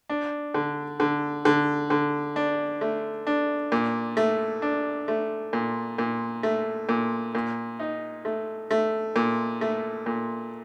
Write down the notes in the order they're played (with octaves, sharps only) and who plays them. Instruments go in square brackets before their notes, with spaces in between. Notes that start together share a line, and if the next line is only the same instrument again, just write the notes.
[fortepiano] D4
D3
D3
D3
D3
D4
A3
D4
A#2
A3
D4
A3
A#2
A#2
A3
A#2
A#2
D#4
A3
A3
A#2
A3
A#2